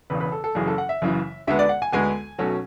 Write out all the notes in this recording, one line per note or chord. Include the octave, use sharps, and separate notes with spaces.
E1 E2 C#3 B4
B4
A4
A4
F#1 F#2 C#3 E3 G#4
A4
F#5
E5
F#1 F#2 C#3 E3
D2 D3 G#3 B3 E5
D5
F#5
G#5
D2 D3 G#3 B3 G#5
B1 B2 F#3 A3 C#4